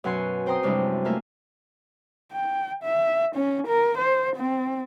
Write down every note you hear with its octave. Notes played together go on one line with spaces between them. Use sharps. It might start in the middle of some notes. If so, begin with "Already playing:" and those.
F#2 B2 F#5 G#5 C6
C4 C5 G5 A#5 C6 D#6
F#2 C3 G3 G#3 D4 E4
A3 A#3 F4 A#4 E5 G#5
G5
E5
C#4
A#4
C5
C4